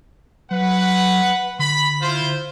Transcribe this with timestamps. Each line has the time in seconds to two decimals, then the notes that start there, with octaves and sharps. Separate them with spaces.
0.51 F#3 B4 F#5
1.59 D3 B5
2.02 E4 F4 C5